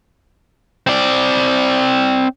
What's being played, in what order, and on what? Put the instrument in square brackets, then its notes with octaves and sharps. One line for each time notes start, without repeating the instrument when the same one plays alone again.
[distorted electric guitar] C4 D5